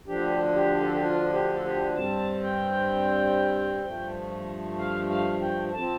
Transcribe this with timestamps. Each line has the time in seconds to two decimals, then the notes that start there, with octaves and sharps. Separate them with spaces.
0.07 D2 D3 F3 D4 G4
0.55 G4
0.81 A4
0.92 G4
1.03 F4
1.33 G4
1.53 A4
1.65 G4
1.96 G2 G3 C4 A5
2.43 G5
3.84 G2 F3 A3
4.79 F5
5.10 F5
5.42 G5
5.74 F3 C4 A5